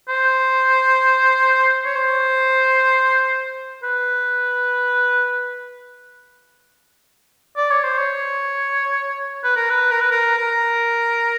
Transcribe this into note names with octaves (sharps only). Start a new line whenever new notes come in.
C5
C#5
C5
B4
D5
C#5
C5
C#5
B4
A#4
B4
A#4
B4
A#4
A#4